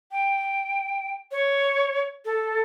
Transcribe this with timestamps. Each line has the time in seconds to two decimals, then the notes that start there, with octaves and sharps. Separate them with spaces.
0.12 G5
1.31 C#5
2.25 A4